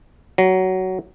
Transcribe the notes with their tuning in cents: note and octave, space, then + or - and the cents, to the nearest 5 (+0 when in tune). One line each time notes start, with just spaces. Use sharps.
F#3 +15